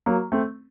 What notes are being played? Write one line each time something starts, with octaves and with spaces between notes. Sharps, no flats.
F#3 A#3
A3 C4